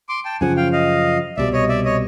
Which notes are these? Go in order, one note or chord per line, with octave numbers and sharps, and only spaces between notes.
C6 D6
G5 A5
F#2 C#3 F3 F#5 G#5
F5 G5
D#5 F5
C2 B2 G3 D5 E5
C#5 D#5
D5 E5
C#5 D#5